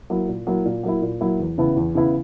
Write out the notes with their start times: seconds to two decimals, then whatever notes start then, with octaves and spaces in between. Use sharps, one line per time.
0.10 F#3 A#3 E4
0.28 A#2
0.47 F#3 A#3 E4
0.65 A#2
0.83 F#3 A#3 E4
1.02 A#2
1.21 F#3 A#3 E4
1.40 E2
1.58 C#3 E3 B3 E4
1.76 E2
1.95 C#3 E3 B3 E4